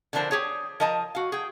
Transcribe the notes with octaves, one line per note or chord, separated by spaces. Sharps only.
D3 E3 F3 D4 A#4 C5
G4 G#4 C#5
F3 A#4 D#5 A5 A#5
F#4 F5
G#4 G5